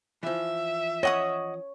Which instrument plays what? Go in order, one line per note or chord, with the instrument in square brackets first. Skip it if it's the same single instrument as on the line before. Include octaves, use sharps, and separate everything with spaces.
[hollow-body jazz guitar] E3 F3 [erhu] E5
[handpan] C#5 [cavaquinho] D#5 F#5 D#6